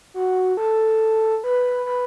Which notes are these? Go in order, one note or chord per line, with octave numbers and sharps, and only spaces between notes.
F#4
A4
B4
B4